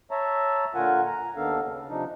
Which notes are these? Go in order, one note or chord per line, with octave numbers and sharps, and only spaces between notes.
C#5 E5 A5 A#5
A#2 D3 F4 A#4 F#5 G#5
A#5
D#2 D#3 B3 D4 A4 F5
C#3
C3 F3 D4 D#4